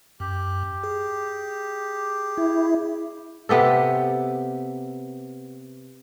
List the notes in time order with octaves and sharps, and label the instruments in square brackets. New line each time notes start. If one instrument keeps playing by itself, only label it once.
[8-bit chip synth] F#2 [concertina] G4
[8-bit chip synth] G#4
[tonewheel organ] E4
[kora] C3 B3 G4 A4